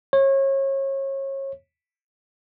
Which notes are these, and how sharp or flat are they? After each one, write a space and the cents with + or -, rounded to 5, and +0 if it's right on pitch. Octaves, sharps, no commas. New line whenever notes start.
C#5 -30